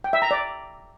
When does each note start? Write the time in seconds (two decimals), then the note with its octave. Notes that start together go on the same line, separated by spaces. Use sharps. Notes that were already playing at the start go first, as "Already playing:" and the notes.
0.04 G5
0.13 E5
0.22 A#5
0.31 D5